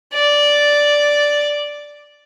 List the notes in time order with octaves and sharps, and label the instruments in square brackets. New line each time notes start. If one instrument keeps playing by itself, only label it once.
[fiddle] D5